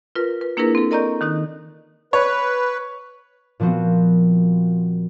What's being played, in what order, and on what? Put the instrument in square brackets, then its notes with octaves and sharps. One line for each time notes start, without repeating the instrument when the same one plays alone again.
[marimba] F4 A#4 B4
B4
A#3 D4 E4 G#4 A#4 B4
C4 A4
A#4 D5 D#5 A#5 C#6 G6
D#3 D#4 F#6
[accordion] B4 [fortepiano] C#5
[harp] A#2 F3 B3 C4 F#4